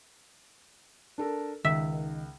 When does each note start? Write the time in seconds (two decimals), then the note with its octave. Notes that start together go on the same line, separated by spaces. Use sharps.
1.18 D4 A4 A#4
1.65 C#2 D#3 E5